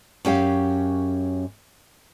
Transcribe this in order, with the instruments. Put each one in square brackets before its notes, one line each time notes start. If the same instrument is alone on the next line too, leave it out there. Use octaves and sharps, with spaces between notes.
[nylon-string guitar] F#2 C#4 G4 F5